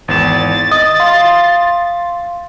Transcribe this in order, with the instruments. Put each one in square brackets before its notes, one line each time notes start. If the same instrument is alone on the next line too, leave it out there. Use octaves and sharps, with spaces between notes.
[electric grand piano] G#1 E2 E7 [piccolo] A6
[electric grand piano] D#5 [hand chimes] D#6
[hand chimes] F5 [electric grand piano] C6